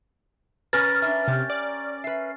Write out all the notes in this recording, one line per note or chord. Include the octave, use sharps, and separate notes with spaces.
C#4 A#4 B4 A6
D4 E5
C3 G4
D5
B4 E5 C7